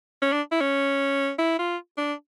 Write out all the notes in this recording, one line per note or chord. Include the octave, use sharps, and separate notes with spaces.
C#4
D4
E4
C#4
E4
F4
D4